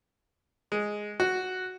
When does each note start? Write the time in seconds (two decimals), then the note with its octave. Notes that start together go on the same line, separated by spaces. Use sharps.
0.72 G#3
1.20 F#4